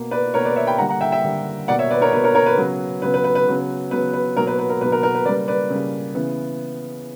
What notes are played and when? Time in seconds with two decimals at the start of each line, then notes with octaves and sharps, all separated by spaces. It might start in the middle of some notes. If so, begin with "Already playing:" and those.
Already playing: B2 A#3
0.11 B4 D5
0.34 B2 A#3 A#4 C#5
0.45 B4 D5
0.56 C#5 E5
0.67 G5 B5
0.78 D3 G3 A#3 F#5 A#5
0.89 F#5 A#5
1.01 E5 G5
1.12 E5 G5
1.23 D3 G3 A#3
1.68 B2 A#3 D5 F#5
1.79 C#5 E5
1.91 B4 D5
2.01 A#4 C#5
2.13 B2 A#3 B4
2.24 A#4 C#5
2.35 A#4 C#5
2.46 B4
2.57 C#3 F#3 B3
3.02 C#3 F#3 B3 B4
3.14 B4
3.24 B4
3.35 B4
3.47 C#3 F#3 B3
3.91 C#3 F#3 B3 B4
4.13 B4
4.37 B2 F#3 A#3 A#4
4.47 B4
4.59 B4
4.70 A#4
4.80 B2 F#3 A#3 B4
4.92 A#4
5.03 A#4
5.15 B4
5.26 C#3 G3 A#3 B4 D5
5.48 B4 D5
5.70 C#3 G3 A#3
6.15 C#3 E3 B3